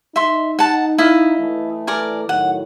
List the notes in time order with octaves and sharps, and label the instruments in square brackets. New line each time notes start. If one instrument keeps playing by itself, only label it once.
[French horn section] D#4 [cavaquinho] E5 C6
[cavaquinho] F#5 A5
E4 D#5 F5
[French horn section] E3 A3
[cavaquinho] A#4 D5 G#5
[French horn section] A2 D#3 F#3 [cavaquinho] F#5